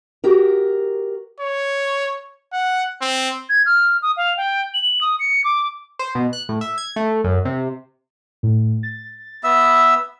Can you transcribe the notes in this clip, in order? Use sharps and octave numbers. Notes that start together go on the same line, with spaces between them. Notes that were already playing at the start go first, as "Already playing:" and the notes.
F#4 G4 A#4
C#5
F#5
C4
G#6
F6
D#6
F5
G5
F#7
D#6
C#7
D6
C5
B2
F#6
A2
E5
G#6
A3
F#2
C3
A2
A6
B3 E5 E6